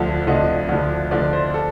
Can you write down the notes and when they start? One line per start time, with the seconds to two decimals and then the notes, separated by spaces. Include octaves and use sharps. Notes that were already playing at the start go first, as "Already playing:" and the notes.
Already playing: D2 D3 F3
0.27 D2 D3 F3 D#5
0.69 D2 D3 F3
1.11 D2 D3 F3 D5
1.33 C5
1.54 A4